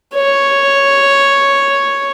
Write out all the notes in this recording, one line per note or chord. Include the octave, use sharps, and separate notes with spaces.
C#5